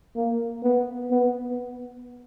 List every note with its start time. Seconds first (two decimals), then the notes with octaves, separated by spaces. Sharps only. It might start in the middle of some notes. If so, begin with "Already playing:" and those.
0.16 A#3
0.63 B3
1.10 B3